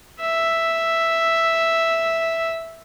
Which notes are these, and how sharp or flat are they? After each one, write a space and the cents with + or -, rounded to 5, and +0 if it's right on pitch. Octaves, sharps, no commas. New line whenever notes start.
E5 +0